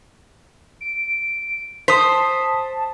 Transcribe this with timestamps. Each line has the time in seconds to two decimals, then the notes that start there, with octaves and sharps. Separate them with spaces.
0.81 D7
1.88 C5 A5 D#6 B6